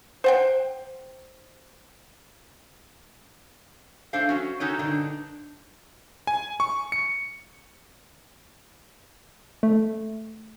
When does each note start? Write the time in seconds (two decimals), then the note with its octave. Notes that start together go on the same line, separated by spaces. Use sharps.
0.24 C5 F#5 G5
4.13 A2 D4 A4 C5 F5
4.29 F#3 C#4 F#4
4.60 D#3 C#4 D#4 F#4 A4 C#5
4.79 G2 A#2 D3 D4 D#4
6.27 G#5
6.60 C#6
6.92 C#7
9.63 A3